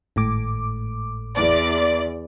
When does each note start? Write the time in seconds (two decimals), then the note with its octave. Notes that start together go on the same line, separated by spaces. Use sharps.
0.16 G#1 A2 D6
1.36 E2 D5